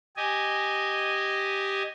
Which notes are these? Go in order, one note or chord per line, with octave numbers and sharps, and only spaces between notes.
G4 D#5 G#5